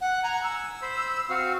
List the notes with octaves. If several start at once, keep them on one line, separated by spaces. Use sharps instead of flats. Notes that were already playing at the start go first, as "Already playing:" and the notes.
F#5
F#5 G#5 A#5
E6
C5 B5
C4 F#4 F5